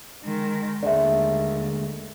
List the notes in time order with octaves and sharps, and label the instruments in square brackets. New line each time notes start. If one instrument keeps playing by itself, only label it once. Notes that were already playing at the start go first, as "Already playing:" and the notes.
[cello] D#3 G#3
[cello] D#2 [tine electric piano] D3 G#3 A3 [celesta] D5 E5